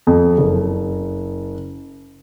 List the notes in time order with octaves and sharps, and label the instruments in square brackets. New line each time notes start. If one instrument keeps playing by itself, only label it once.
[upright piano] F2
F#1